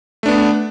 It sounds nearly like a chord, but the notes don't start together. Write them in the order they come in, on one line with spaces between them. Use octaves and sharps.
A3 D4 B3